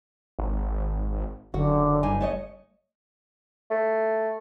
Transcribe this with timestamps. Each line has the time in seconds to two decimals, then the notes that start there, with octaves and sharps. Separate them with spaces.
0.39 G#1
1.54 F#1 D3 F#4
2.03 G2 D#4 G#5
2.21 A3 C#5 D#5
3.71 A3